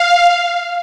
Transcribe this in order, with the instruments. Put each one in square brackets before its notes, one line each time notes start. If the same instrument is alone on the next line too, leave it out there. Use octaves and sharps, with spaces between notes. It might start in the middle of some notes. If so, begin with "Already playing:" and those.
Already playing: [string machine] F5